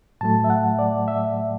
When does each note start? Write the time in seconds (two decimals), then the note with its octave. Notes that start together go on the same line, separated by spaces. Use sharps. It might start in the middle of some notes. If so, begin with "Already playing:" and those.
0.21 A2 F#3 A3 A5
0.44 E5
0.50 F#5
0.79 D5
1.08 E5